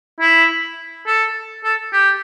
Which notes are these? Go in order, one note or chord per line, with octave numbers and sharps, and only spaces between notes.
E4
A4
A4
G4